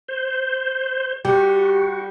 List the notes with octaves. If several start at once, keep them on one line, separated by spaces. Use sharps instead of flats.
C5
G3 F#4 G4